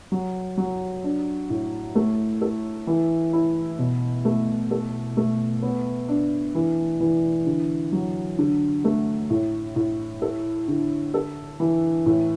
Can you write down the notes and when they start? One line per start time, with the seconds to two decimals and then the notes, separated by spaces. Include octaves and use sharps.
0.12 F#3
0.57 F#3
1.04 D4
1.50 A2
1.95 A3
2.41 A4
2.87 E3
3.33 E4
3.79 B2
4.25 A3
4.71 A4
5.17 A3
5.62 B3
6.08 D4
6.55 E3
7.00 E3
7.47 D3
7.92 F#3
8.39 D3
8.84 A3
9.30 A2
9.76 A2
10.22 A4
10.68 D3
11.14 A4
11.60 E3
12.06 A2